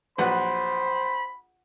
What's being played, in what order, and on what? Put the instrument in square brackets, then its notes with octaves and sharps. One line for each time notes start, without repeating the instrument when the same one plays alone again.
[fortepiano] A#1 F#3 B4 [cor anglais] C5 [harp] F#5 [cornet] B5